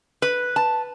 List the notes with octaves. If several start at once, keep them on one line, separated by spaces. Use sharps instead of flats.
B4
A5